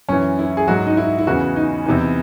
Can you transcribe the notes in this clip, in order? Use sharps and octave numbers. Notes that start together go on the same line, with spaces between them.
F#2 E3 C#4
E4
G#4
G#2 F#3 F#4
D#4
E4
E4
E2 C#3 E3 F#4
D#4
E2 C3 E3 D#4